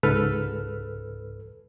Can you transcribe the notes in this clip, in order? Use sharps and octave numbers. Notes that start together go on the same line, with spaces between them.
C#2 G#2 A4 B4 F6